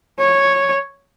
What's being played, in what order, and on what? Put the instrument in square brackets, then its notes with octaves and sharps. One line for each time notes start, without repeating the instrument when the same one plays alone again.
[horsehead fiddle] C#5